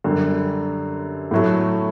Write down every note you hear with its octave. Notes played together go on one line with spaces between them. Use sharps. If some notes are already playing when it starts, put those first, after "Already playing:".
F#2 D3 G3
A2 F#3 A3